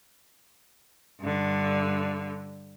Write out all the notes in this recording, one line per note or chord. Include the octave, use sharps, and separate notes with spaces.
G2 D3